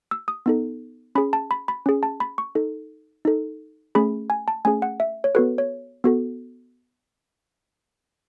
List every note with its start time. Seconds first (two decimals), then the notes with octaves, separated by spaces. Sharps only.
0.11 E6
0.28 D#6
0.46 B3 D#4 A4
1.15 C#4 G#4 B5
1.33 A5
1.51 B5
1.68 B5
1.86 C#4 G#4
2.03 A5
2.20 B5
2.38 C#6
2.55 D#4 A4
3.25 D#4 A4
3.95 A3 C#4 G#4 B5
4.30 G#5
4.48 A5
4.65 A3 C#4 G#4 G#5
4.82 F#5
5.00 E5
5.24 C#5
5.35 B3 F#4 A4 B4
5.58 C#5
6.04 B3 F#4 A4